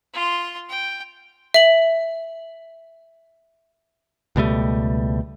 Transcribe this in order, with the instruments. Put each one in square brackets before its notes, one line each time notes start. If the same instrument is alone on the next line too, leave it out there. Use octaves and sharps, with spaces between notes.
[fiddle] F4 C6
G5
[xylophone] E5 F#7
[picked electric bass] C#2 B2 G3 A3